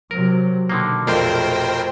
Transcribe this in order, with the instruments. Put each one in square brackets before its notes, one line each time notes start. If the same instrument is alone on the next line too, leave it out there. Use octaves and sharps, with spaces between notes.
[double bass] C3 F#3 [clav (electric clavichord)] A#4
[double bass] B2 [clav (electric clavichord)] D3 D#3 A#3
[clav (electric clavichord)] A#1 F5 [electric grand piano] F2 A3 D#5 [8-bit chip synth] A#4 C5 G5